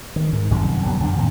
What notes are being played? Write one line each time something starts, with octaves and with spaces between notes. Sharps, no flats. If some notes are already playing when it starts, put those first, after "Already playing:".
D#3
G#2
G1 F#2 C3 D#3
F#2 F#3 G3 B3
F2 D3 F3 D4
A2 C3 D#3